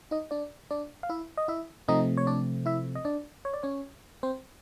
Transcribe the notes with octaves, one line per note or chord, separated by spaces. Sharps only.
D#4 D#5
D4 D5
D4 D5
F5
E4 E5
D#5
E4 E5
C3 F3 A3 C4 D#4 D#5
C#5
D4 D5
E4 E5
D#5
D4 D5
C#5
D5
C#4 C#5
C4 C5